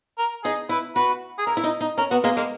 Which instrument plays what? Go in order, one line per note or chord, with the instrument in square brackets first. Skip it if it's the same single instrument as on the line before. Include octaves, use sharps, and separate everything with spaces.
[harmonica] A#4
[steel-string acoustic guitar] D#4 [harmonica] G#4
[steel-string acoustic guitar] E4 [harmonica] B4
[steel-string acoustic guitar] F#4 [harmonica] B4
[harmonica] G#4
[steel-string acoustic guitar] E4 [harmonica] A#4
[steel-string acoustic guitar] E4
D#4
D#4
[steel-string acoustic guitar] C#4 [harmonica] A#4
[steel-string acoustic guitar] B3 [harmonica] F#4
[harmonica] G#3 [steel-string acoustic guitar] A#3
[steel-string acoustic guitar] G#3 [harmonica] A#3